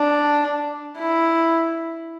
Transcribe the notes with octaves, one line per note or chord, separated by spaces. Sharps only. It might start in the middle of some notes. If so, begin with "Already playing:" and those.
Already playing: D4
E4